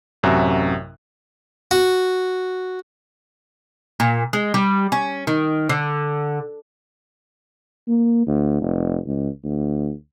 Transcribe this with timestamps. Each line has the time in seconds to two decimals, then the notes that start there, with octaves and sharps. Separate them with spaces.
0.23 A1 F#2 C3 F#4 E5 F#6
1.71 F#4
4.00 A#2
4.33 G#3
4.54 G3
4.92 C#4
5.27 D#3
5.69 D3
7.88 A#3
8.27 D2
8.61 F1
9.06 C#2
9.44 D2